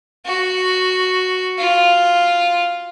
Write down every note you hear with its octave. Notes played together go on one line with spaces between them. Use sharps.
F#4
F4